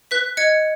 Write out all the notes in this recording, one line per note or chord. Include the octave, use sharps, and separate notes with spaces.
B4 F#6 B6
D#5 G#6 C#7